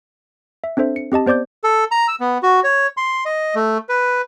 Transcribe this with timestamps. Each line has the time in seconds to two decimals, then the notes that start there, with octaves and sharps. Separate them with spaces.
0.64 E5
0.77 C4 D4 A4 C5 E5
0.96 C#7
1.12 C4 G4 D#5 A5
1.26 B3 C5 D5 D6 G6
1.64 A4
1.91 A#5
2.08 E6
2.20 B3
2.43 F#4
2.64 C#5
2.97 C6
3.25 D#5
3.55 A3
3.89 B4